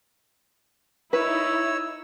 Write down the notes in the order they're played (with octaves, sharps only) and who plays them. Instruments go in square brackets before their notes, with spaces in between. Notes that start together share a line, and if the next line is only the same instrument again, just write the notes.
[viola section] D#4 E4 [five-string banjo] B4 [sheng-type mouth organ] C#5 E6